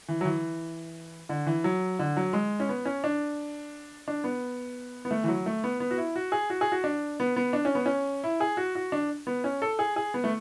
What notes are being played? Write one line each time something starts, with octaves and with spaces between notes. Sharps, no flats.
E3
F#3
E3
D3
E3
F#3
D3
F#3
G#3
C#4
B3
C#4
D4
D4
B3
B3
A3
E3
F#3
A3
B3
B3
F#4
E4
F#4
G#4
F#4
G#4
F#4
D4
B3
B3
D4
C#4
B3
C#4
E4
G#4
F#4
F#4
D4
B3
C#4
A4
G#4
G#4
B3
A3